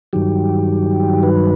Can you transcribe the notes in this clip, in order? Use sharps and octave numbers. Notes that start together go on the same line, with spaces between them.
G2 D#3 F#3 G4
B4